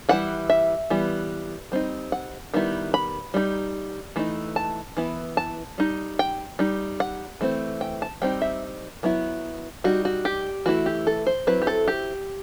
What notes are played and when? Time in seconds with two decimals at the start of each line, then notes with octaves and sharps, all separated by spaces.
0.09 E3 G3 E4 F#5
0.50 E5
0.90 E3 G3 B3
1.72 G3 C4 D#4
2.12 F#5
2.54 D#3 G3 B3 E4
2.94 B5
3.34 G3 D#4
4.16 E3 A3 D#4
4.56 A5
4.97 E3 B3 E4
5.37 A5
5.78 G3 D#4
6.19 G5
6.59 G3 D#4
7.00 F#5
7.41 E3 A3 C4
7.81 G5
8.02 A5
8.22 G3 C4 D#4 G5
8.42 E5
9.03 F#3 B3 E4
9.84 G3 D#4 F#4
10.05 F#4
10.25 G4
10.66 E3 A3 E4 F#4
10.86 G4
11.07 A4
11.27 C5
11.47 F#3 C4 E4 B4
11.62 G4
11.67 A4
11.88 G4